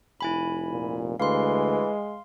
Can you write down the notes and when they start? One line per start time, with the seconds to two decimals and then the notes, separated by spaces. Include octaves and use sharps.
0.21 F1 E4 G#5 B5
0.71 A#2
1.20 D2 E3 G#3 F5 C6